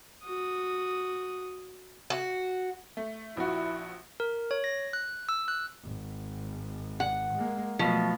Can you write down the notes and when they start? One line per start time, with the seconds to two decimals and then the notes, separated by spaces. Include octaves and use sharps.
0.24 F#4 D#6
2.10 F#4
2.97 A3
3.37 A#1 F3 E4 F#4
4.20 A#4
4.51 C#5
4.64 A#6
4.93 F#6
5.29 E6
5.48 F#6
5.83 G#1
7.00 F#5
7.35 G#3 A#3
7.79 B2 F3 F#3 A3